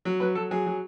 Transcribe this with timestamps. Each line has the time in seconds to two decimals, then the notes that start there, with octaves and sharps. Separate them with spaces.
0.05 F#3
0.20 F#3 B4
0.35 F#3 A4
0.51 F#3 G#4
0.66 F#3